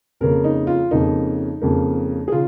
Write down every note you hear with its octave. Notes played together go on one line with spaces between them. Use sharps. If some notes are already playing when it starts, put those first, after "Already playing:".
F2 C#3 A#3 A#4
D#4
F4
F2 C#3 A#3 D#4
F2 C#3 A#3
G#4
C#3 F4